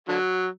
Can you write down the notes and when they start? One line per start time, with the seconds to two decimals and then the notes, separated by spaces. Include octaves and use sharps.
0.08 D3 F#3